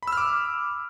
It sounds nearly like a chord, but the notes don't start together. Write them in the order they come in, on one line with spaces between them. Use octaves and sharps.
B5 E6 F6 D6